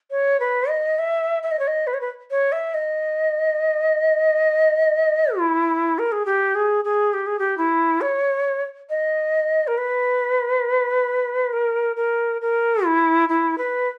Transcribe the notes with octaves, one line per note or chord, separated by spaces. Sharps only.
C#5
B4
D#5
E5
E5
D#5
C#5
D#5
B4
C#5
B4
C#5
E5
D#5
E4
A#4
G#4
G4
G#4
G#4
G4
G#4
G4
E4
C#5
D#5
A#4
B4
A#4
A#4
A#4
E4
E4
B4